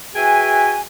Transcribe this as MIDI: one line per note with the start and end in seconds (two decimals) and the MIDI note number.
0.15 0.81 66
0.15 0.81 68
0.15 0.81 71
0.15 0.81 76
0.15 0.81 79
0.15 0.81 80